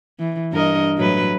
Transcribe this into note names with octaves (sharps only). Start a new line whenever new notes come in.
E3
G2 A#4 D#5
A2 F#3 B4